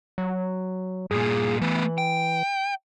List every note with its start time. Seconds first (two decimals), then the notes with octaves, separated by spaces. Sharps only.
0.18 F#3
1.11 G2 A#2 G#4
1.61 E3 A3 B3
1.98 G5